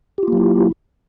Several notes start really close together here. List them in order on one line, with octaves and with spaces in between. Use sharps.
G4 F4 A#3 F#3 E4